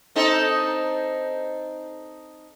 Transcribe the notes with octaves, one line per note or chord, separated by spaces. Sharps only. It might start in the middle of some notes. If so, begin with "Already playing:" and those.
C4 D#4 A4